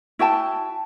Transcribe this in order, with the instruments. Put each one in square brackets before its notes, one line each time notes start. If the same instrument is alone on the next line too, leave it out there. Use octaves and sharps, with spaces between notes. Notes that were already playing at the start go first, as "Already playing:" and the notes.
[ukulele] E4 F#4 G5 A5